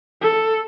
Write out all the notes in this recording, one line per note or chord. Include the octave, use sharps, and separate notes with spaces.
A4